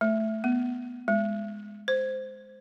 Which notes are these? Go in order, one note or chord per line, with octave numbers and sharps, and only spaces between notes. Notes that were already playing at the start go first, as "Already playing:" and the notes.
A3
B3
G#3
C5